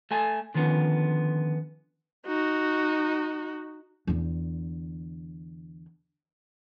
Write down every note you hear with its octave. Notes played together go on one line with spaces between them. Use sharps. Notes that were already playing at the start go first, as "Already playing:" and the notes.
A3 A4 G#5
D3 D#3 F3 B3 C#4
D#4 F#4
E2 D3